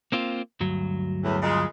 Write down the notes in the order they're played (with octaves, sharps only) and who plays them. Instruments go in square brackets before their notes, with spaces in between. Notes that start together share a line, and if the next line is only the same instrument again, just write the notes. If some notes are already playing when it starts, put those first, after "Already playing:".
[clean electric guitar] A#3 C4 F4
D2 G2 F#3
[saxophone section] E2 A2
A#2 C#3 G#3